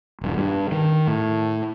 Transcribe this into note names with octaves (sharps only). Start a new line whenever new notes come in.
D#1 G2
G2
D#3
A2